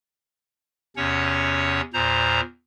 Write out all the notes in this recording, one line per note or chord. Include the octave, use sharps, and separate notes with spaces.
E2 C3 C#4 C#5 F#5
E2 A#2 C5 A#5